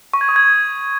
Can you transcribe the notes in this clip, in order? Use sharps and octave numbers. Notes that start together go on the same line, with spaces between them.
C#6
G#6
D#6
G#6